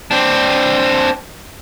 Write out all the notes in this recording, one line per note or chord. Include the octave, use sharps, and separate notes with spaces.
C4 D4